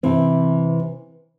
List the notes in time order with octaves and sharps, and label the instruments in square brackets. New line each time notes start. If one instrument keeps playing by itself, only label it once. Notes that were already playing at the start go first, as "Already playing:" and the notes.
[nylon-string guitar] C3 E3 C4